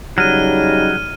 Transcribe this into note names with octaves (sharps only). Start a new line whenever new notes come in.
C#3 F#3 G3 D#4 F6 D#7